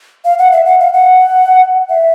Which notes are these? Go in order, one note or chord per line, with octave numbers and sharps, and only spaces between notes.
F5
F#5
E5
F#5
F5
F#5
E5